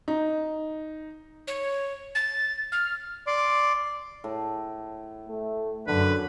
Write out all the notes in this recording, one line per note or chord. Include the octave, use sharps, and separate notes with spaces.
D#4
C#5
A6
F6
D5 C6 D6
A2
A3
F#2 D3 B4